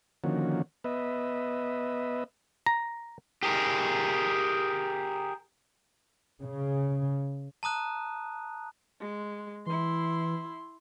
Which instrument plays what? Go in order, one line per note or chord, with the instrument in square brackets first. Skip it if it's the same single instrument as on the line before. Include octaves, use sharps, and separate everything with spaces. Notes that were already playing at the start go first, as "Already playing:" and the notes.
[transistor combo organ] D3 D#3 F3 A#3 C#4 F#4
B3 B4 D#5 E5
[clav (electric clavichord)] A#5
[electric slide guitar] G4 G#4 A#4
[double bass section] C#3
[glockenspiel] A5 A#5 D#6 F#6
[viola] G#3
[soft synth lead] E3 [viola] E4 C6